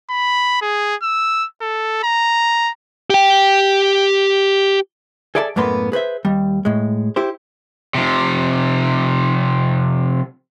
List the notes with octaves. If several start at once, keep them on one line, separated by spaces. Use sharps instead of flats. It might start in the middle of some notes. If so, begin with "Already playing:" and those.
B5
G#4
E6
A4
A#5
G4 G5
G#4 A4 D5 E5 G#5 A5
F#2 A2 A#3 B3 B4 C6
G#4 B4 C5 E5
D#2 G3
A2 G#3
E4 G4 C5
C3 F3